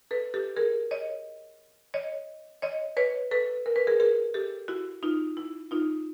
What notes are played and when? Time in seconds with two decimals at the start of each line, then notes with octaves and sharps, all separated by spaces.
0.11 A4 B4
0.34 G4 A4
0.57 G#4 A#4
0.91 C#5 D#5
1.94 C#5 D#5
2.62 C#5 D#5
2.97 B4 C#5
3.31 A4 B4
3.66 A#4
3.76 B4
3.87 G#4 A#4
4.00 G#4 A#4
4.34 G4 A4
4.68 E4 F#4
5.03 D#4 F4
5.37 E4
5.71 D#4 F4